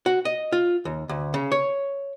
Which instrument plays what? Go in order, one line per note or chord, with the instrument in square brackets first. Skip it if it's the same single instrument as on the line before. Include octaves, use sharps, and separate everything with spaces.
[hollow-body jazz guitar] F#4
D#5
F4
D#2
D2
C#3
C#5